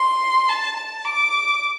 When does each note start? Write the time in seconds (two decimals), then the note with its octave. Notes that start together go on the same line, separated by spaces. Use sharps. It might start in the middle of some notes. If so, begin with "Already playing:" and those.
Already playing: C6
0.49 A5
0.77 A5
1.05 D6